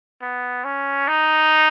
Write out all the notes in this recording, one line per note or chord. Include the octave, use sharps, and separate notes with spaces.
B3
C#4
D#4